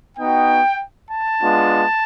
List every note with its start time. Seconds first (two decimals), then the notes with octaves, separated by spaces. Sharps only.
0.17 B3 D#4 F#4 G5
1.09 A5
1.40 G#3 B3 D4 F4